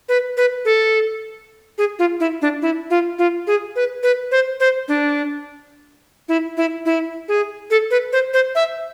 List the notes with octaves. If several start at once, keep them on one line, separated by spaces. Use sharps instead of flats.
B4
B4
A4
G#4
F4
E4
D4
E4
F4
F4
G#4
B4
B4
C5
C5
D4
E4
E4
E4
G#4
A4
B4
C5
C5
E5